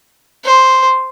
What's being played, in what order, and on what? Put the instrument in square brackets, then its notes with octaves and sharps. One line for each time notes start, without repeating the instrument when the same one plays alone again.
[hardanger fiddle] C5